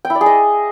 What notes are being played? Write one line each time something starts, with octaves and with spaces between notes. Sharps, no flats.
G5
E4
D5
G#4
D#5